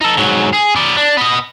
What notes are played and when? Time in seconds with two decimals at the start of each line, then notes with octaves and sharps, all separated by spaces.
0.01 D#4 A4
0.17 G#2 F#3
0.53 G#4
0.76 B3 D5
0.97 D4
1.17 B3 D#5